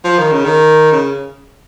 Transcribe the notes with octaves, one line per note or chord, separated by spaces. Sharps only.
F3
D#3
C#3
D#3
C#3